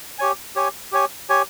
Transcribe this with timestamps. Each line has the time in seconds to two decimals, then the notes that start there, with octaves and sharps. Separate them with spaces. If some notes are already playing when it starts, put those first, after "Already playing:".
0.19 G4 C#5 G#5
0.56 G4 C#5 G#5
0.92 G4 C#5 G#5
1.29 G4 C#5 G#5